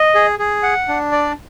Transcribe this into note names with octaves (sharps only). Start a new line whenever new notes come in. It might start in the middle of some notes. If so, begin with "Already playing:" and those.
Already playing: D#5
G#4
G#4
F#5
D4
D5